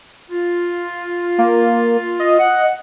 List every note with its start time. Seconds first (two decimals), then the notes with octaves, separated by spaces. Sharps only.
0.31 F4
1.38 A#3
2.19 D#5
2.40 F#5